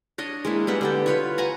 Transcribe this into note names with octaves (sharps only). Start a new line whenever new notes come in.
D4 C#5 D#5
G#3 A#3 E4
G3 B3 B4 F#5
D3 G4 A4
F4 B4 C#5
F#5 G#5 A#5